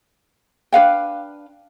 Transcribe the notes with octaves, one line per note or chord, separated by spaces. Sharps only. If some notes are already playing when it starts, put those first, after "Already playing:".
D4 B4 F5 G5